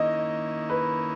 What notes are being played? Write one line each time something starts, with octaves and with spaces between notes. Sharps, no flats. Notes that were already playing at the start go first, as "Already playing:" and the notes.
Already playing: D#3 A#3 C#4 E4 D#5
B4